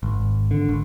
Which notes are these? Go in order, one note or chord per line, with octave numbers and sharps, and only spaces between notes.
G#1
D3
G#1